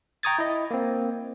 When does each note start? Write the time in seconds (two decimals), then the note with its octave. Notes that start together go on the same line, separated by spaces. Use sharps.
0.23 G5 A#5 C#6 D#6 G#6 A6
0.39 E4 D#5
0.71 A#3 C4